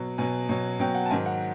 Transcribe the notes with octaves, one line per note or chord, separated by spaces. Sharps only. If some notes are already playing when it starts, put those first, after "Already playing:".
Already playing: B2 F#3
B2 F#3 G#5
B2 F#3
B2 F#3 G5
F#5
A5
G#2 D#3 F#3 G#5
F#5